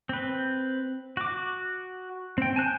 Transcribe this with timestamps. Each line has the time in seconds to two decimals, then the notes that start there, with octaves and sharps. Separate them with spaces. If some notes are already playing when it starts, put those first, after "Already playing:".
0.09 C4 B4
1.17 F#4 D6
2.38 C4 G5
2.56 G#5 A5 F#6 G6